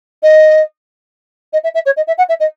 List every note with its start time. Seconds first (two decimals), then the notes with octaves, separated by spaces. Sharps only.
0.23 D#5
1.53 D#5
1.64 E5
1.74 E5
1.86 C#5
1.97 D#5
2.07 E5
2.18 F#5
2.29 E5
2.40 D#5